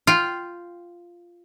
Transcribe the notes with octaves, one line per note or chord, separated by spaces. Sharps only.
F4 G5